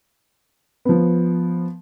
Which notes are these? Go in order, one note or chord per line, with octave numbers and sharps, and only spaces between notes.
F3 B3